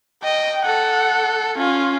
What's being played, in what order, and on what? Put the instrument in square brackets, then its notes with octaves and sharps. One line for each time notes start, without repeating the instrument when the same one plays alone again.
[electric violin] D#5 [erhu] G5
[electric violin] A4 [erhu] F#5
[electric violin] C#4 [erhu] F4